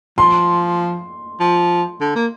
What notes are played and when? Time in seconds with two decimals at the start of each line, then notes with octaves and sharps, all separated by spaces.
0.18 F3 C6
1.40 F3
2.01 D3
2.16 A#3